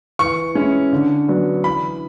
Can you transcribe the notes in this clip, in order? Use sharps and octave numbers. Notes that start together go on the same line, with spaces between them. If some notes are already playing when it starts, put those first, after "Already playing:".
E3 C#6
G#3 C#4 E4
D3
F#3 B3 D4
E3 B5